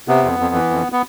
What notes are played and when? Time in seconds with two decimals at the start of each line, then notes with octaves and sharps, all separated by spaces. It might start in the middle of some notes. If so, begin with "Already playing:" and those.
0.08 C3 B3
0.24 F2
0.40 F2
0.55 E3
0.71 F2
0.92 B3